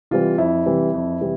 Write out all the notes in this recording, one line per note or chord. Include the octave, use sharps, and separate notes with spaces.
C3 E3 G3 F4
F2 E4
C3 E3 G3
F2
C3 E3 G3